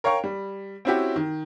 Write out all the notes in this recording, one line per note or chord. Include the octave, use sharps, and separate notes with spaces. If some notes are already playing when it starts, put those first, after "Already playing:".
A#4 C#5 F5 G5 C#6
G3
C4 C#4 E4 F#4 G4
D#3